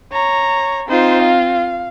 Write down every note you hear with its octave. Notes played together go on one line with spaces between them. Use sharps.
C#5 A#5
C4 D#4 F4 C5
F5